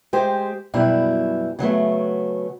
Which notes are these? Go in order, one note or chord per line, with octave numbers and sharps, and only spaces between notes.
G#3 G4 C5
F#2 B2 G3 E4
C#3 F#3 A3 B3